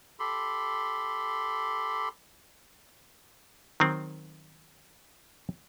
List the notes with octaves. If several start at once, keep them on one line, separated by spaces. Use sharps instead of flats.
G4 A4 B5 C6
D#3 F#3 C4